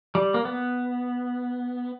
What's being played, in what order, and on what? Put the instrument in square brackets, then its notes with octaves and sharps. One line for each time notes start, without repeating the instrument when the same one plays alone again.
[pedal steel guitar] G3
A#3
B3